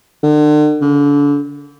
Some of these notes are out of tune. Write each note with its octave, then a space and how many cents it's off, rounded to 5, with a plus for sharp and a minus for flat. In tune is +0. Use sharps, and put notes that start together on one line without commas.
D3 +40
D3 -35